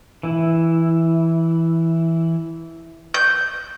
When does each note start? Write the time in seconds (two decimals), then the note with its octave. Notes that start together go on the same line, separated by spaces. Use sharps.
0.23 E3 E4
3.14 G6